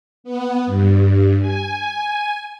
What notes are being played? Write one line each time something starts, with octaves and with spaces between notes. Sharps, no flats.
B3
G2
G#5